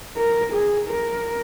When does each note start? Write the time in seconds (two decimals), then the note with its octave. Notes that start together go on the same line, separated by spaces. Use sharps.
0.17 A#4
0.53 G#4
0.88 A#4